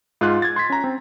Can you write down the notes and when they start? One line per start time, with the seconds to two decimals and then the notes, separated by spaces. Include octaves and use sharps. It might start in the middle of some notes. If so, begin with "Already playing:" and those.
0.21 G#2 F4 G#4 F#6
0.42 G#6 A6
0.56 C6 G#6 B6
0.70 C#4 A#5
0.84 C4